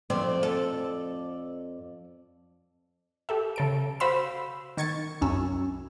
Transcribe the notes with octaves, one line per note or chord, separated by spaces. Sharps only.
F2 C4 D5
A4
G4 A4 E5
C#3 A4 D7
F#4 C5 F5 B5 C6 E6
D#3 C#6 G#6 A6 C#7
C2 F#2 C#4 E6